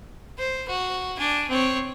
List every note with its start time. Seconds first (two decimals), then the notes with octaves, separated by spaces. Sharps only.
0.39 C5
0.69 F#4
1.17 D4 G#5
1.49 C4 C#5